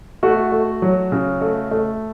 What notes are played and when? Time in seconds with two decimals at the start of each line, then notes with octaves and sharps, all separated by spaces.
0.23 A3 F#4
0.52 A3
0.82 F#3
1.12 C#3
1.41 A3
1.71 A3